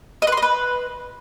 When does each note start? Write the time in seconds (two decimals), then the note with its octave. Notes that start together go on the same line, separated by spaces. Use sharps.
0.22 D#5
0.27 B4
0.32 C6
0.37 D#5
0.42 B4